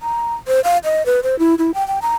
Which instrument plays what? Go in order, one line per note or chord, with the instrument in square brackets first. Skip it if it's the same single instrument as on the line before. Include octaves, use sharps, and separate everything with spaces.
[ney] A#5
C5
F5
D#5
B4
C5
E4
E4
G5
G5
A#5